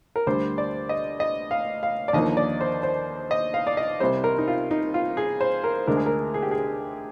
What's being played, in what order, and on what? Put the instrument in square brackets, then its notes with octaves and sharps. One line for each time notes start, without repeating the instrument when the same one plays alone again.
[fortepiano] A#4
D2 D3 G3 C5
D5
D#5
D#5
F5
F5
D5
D#2 D3 F3 A#3 D#4 D#5
D5
C5
C5
D#5
F5
D5
D#5
C2 C3 G3 C5
A#4
D#4
F4
D#4
F4
G#4
C5
A#4
D2 D3 G#3 D4 A#4
G#4
A#4
G#4
G4
G#4